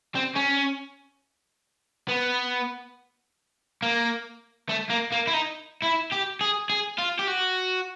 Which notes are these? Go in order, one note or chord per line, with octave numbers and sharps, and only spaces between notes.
C4
C#4
B3
A#3
A3
A#3
A#3
E4
D#4
E4
G4
G#4
G#4
F4
G4
F#4